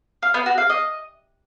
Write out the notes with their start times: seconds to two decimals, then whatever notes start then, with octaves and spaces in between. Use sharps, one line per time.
0.22 F5
0.34 B3
0.46 F#4
0.58 F5
0.69 D#5